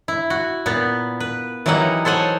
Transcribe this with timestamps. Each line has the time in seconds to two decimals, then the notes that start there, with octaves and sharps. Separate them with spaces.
0.08 E4
0.30 F#4
0.66 A#2 B3
1.20 B4
1.66 E3 F#3 G3 A#3 D#4 F#5
2.05 A4 C5 C#5 F#5 G#5